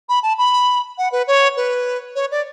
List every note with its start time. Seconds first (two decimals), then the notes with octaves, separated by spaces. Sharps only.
0.09 B5
0.23 A5
0.38 B5
0.98 F#5
1.12 B4
1.28 C#5
1.57 B4
2.15 C#5
2.31 D5